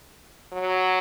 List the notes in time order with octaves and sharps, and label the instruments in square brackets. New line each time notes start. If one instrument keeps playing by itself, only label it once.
[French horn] F#3